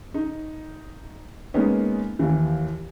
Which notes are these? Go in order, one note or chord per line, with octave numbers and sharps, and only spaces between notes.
D#4
G#3 A#3 B3 C#4 D#4
D#2 E3